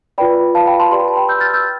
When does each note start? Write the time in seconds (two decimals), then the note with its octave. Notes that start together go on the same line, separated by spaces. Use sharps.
0.18 F4 B4 D5 G5 B5
0.55 F5 A5
0.67 G5 B5
0.79 A5 C6
0.91 G4 B4 D5 C6
1.00 B5
1.08 A5
1.16 G5 B5
1.29 E6 G6
1.40 F6 A6
1.54 E6 G6